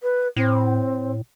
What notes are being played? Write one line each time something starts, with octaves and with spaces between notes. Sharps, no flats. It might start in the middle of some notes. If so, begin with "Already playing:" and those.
B4
A2 C4